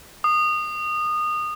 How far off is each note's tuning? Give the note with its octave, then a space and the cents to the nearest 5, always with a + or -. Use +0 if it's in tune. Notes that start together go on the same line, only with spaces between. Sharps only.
D#6 -25